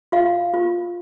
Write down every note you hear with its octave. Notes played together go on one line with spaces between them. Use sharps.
F4 F5
F4